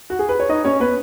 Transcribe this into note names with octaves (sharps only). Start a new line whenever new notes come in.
F#4
G#4
B4
C#5
D#4 D#5
C#4 C#5
B3 B4